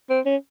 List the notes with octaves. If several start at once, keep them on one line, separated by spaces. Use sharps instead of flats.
C4
C#4